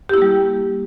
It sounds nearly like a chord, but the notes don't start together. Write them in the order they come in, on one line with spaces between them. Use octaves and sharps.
G4 E4 A#3 G3